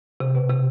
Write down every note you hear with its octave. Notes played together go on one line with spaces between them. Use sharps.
C3
B2
C3